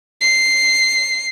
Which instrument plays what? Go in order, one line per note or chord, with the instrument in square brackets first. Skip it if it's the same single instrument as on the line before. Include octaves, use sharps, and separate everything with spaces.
[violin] C7